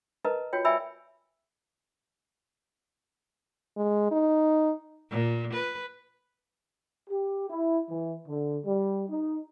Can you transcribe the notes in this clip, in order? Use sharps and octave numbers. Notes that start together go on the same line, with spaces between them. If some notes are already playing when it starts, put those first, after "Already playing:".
A#4 B4 D#5 A5 A#5
F4 F#4 C#5 G5
D5 E5 G5 G#5 B5 E6
G#3
D#4
A#2
B4
G4
E4
E3
D3
G3
D#4